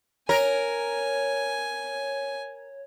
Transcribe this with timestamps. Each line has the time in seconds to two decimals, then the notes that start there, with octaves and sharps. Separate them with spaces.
0.29 A#4 C#5 G#5